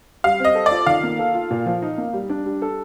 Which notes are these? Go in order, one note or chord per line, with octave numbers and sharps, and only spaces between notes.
G3 F5
C4 D#5
A4
D5
F4
D#3 F5
A#3
A4
F4
A#2
F3
D#4
A#3
G3
D4
G3
A4